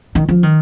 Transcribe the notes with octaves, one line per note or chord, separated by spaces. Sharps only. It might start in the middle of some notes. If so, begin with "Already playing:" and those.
D#3
F3
D#3